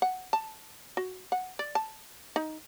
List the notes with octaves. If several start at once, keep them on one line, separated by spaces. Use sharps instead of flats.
F#5
A5
F#4
F#5
D5
A5
D#4